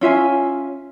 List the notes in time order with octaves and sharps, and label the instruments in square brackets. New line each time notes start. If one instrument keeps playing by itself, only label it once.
[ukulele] C#4 F4 E5 G#5